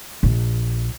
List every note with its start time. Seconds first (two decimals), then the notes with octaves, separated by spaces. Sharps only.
0.23 A#1